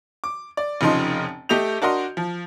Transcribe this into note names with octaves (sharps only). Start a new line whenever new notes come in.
D6
D5
F1 C#3 F3 D#4 C6
A3 G4 D#5 G6 F7
D4 F#4 A#4 D#5 C6
F3